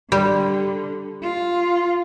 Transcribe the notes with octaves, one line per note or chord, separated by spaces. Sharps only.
D3 G3 G4
F4